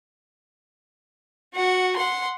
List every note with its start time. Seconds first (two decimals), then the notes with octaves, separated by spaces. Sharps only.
1.54 F#4 F#5
1.97 F#5 C6